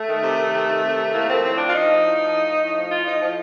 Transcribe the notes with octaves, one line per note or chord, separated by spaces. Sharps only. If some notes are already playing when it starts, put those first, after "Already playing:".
Already playing: A3
D#3
C3
D#3
C3
D#3
C3
D#3
A2 A#3
F3 C4
A2 C4
F3 D4
F4
A2 D#4
F3
A2
F3
A2
F3
A2
F3
A2 F4
F3 D#4
A2 F3